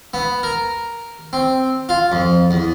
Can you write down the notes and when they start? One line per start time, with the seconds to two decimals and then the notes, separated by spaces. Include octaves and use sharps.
0.14 B3
0.43 A#4
1.33 C4
1.89 F4
2.12 F2
2.51 E2